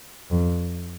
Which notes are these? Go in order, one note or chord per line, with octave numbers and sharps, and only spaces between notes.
F2